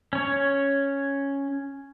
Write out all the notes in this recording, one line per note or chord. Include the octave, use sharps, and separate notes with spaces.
C#4 C#5